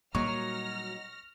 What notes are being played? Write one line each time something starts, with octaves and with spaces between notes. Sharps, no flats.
A#2 F#3 G3 A#3 D#4 C#6 F6 A#6